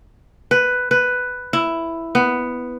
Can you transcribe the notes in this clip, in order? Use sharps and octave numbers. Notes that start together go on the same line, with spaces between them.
B4
B4
E4
B3